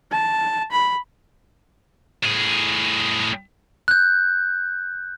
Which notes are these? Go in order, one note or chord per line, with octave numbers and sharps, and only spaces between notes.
A5
B5
A2 G#4
F#6 G6